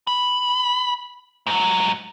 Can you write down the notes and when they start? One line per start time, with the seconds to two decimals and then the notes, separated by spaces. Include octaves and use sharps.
0.07 B5
1.47 G#2 F#3